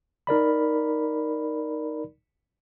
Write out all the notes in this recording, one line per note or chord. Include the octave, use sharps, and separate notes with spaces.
D#4 A#4 D5 B5